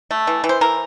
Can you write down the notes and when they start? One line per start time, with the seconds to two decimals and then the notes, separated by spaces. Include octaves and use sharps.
0.11 A3
0.27 E3
0.44 E3
0.49 C5
0.61 E3 A#4